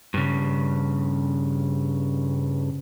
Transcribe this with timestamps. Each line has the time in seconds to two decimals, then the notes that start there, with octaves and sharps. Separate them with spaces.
0.14 G2 C#3